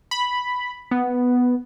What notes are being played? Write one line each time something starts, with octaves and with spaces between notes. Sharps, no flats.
B5
B3